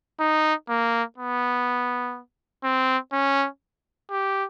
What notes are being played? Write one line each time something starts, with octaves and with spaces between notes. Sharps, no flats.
D#4
A#3
B3
C4
C#4
G4